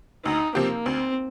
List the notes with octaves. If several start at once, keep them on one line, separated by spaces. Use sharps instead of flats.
D2 D#4
C3 F3 A#3 C4 G4
D2 C4